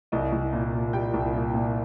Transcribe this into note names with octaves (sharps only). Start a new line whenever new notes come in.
C2 D#5
C2
A#2
A#2
G3 G5
C2
A#2
A#2